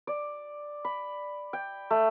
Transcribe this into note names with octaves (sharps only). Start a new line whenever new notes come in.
D5
B5
G5
A3